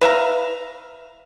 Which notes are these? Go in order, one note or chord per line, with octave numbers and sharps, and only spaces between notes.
B4 E5 F5 A#5